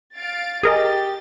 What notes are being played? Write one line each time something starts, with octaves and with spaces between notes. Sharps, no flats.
F5 A6 D7
G4 G#4 A#4 D#5 A6